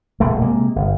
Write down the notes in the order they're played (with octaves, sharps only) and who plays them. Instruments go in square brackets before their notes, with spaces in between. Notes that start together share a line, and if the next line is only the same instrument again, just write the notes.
[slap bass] E1 A#1 C#3 A3
C3 G#3 A#3
G1